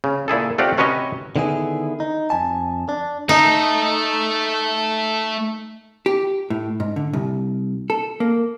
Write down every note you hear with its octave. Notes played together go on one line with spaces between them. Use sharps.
C#3
A#2 E4 G#4 A4
A3 C4 F4 G4 D5 F#5
C3 C#4 F#4 B4 C#5 D#5
D3 D#3 B3 E4 G#4
D#4
F2 G#5 A5
D4
A3 D#4 A4
G4
A2
G#2
D3
C2
A4
A#3